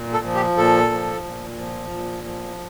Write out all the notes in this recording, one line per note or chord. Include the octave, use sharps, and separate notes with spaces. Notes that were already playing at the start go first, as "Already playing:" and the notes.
Already playing: A#2
A4
F3
G4
A#2 A4
F3
A#2
F3
A#2
F3